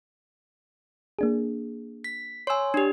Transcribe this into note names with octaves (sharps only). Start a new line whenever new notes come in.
A#3 D4 G#4
B6
C#5 G#5 C6 E6
D4 G4